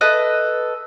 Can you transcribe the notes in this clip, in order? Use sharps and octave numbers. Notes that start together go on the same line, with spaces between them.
A4 B4 D#5